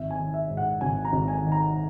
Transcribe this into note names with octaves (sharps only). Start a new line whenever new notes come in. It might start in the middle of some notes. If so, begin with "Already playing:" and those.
Already playing: G#1 E5
G#5
D#3
E5
G#2
F#5
G#1 G#5
A#5
G#1
G#5
D#3
A#5